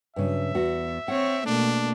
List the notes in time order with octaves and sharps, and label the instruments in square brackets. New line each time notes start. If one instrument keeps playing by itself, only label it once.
[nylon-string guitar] G2 C#3 F#3 [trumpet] E5
[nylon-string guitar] E2 F#4
[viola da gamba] C4 C#5 [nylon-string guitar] F#5
[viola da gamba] B2 A3 A#3 [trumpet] D4